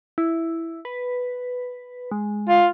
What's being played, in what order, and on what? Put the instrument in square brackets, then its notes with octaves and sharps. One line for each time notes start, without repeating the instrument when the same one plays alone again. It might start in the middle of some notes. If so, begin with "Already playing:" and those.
[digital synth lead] E4
B4
G#3
[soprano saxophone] F4